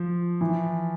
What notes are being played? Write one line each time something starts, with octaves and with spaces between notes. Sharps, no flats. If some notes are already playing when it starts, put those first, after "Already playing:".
Already playing: F3
E3